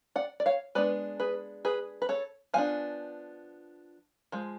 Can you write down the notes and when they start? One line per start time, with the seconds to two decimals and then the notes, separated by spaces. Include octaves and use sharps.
0.16 D5 F#5
0.40 D5
0.46 C#5 F5
0.75 G#3 B3 D4 B4 D5
1.20 G#4 B4
1.65 G#4 B4
2.02 B4
2.09 A4 C#5
2.54 F3 B3 D4 F5 G#5
4.32 F3 G#3